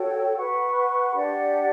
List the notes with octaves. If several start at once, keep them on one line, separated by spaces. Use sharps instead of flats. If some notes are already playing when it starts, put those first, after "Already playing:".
Already playing: F#4 A4 C#5 G5
B4 F#5 C#6
D4 G4 D5 F#5